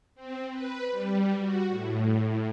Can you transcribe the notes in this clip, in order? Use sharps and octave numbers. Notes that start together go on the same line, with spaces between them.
C4
B4
G3
F#4
A2